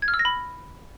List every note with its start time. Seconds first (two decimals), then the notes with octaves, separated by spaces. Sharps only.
0.02 G#6
0.08 F6
0.14 E6
0.19 A#6
0.25 B5